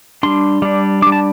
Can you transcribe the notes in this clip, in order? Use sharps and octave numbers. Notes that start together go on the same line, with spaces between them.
G3 D4 C6
G3 D4
G3 D4 D6
A5